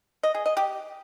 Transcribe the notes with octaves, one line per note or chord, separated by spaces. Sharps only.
D#5
G#4
D#5
G4